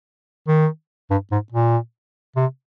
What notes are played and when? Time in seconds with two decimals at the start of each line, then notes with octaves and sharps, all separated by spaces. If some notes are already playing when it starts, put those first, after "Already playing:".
0.48 D#3
1.10 G2
1.31 G#2
1.52 A#2
2.36 C3